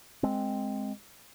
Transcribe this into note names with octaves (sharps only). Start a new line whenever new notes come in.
G#3 C4